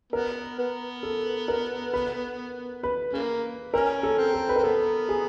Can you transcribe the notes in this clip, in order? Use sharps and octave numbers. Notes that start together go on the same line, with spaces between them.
B3 A#4
B3
A4
A#4
B4
B4
C#3 A#3
C#4 A#4
A4
C4
A4
B4
C4 A#4
B3 A4
G#4